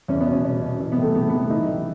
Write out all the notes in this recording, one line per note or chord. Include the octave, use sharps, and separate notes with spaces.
E2 C#4
B3
B2
C#4
B2
B2
E3
B3
A1
A3
A1 B3
A3
A1 B3
E3 D#4
A1